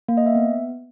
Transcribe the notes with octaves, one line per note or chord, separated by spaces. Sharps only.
A#3
D#5
E5
B3